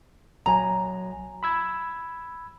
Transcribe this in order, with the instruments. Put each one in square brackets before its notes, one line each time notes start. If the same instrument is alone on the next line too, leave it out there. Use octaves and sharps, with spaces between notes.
[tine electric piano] A#1 F#3 G#5 [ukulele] A#5
[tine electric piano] B5 E6 G#6